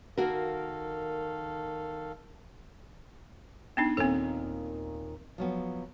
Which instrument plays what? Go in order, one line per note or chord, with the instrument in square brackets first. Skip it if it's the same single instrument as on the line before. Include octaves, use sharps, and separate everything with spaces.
[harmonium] D#3 A4 F5 [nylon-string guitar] A#3 F#4 A#4
[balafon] B3 D4 D#4
[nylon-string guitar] D#2 A#2 D#3 [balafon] C4 A4
[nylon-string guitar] F3 F#3 B3